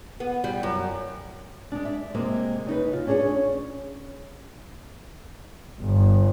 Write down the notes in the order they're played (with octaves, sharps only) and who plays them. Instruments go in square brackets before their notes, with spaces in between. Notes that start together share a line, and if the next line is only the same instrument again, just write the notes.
[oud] B3
G3
F#2
[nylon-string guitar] G#3 D4
E5
C3 G#3 A#3
C#3 D#4 B4
F4
C#4 D4 G#4 B4 C#5
[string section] G1